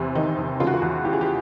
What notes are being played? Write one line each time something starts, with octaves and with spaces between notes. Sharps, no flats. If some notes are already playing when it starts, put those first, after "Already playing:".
Already playing: E2 C3
D#3 D#4
E2
C#3 F4
F#4
F4
E2 F#4
E3 G4
G#4
G4